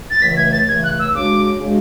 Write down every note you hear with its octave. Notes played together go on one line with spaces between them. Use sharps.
A6
C#2 C#3 E3 A3 B6
G#6
A6
C#2 C#3 E3 A3 G#6
F#6
E6
C#3 G#3 D4 F#4 D6
C#3 G#3 D4 F#4